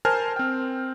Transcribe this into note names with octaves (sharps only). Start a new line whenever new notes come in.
A#4 C5 G#5 A5 F6
C4 G5